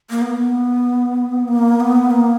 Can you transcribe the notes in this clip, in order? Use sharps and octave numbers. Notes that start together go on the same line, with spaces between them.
A#3
B3
A#3
B3
A#3